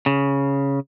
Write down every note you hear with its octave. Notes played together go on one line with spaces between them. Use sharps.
C#3